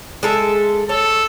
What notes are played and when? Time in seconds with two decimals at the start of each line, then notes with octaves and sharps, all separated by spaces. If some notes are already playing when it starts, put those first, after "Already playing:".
0.23 G#3 A4 E5
0.89 A4 C#5